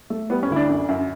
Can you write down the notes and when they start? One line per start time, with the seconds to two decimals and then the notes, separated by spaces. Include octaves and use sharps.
0.10 A3
0.30 G3 B3
0.43 C#4
0.50 D2 E4
0.56 D4
0.69 F#2
0.89 F#2